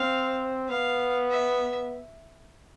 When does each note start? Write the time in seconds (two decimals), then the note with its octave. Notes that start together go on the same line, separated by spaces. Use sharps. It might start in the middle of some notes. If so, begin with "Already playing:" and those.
Already playing: C4 F5
0.69 B3 F5
1.31 E5